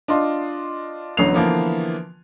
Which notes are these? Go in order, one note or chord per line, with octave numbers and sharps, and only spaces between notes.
D4 F4 D#5 C6
A1 D3 F#3 B3 C7 F7
D3 E3 F3 A#3 B3